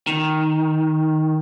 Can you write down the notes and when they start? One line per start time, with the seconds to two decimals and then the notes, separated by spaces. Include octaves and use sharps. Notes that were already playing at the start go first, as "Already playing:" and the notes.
0.07 D#3